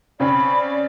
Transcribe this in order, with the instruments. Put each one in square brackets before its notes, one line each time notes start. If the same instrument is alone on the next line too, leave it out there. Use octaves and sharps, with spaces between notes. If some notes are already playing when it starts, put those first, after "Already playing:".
[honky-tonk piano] C#3 C4 C#4 [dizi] D5 [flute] B5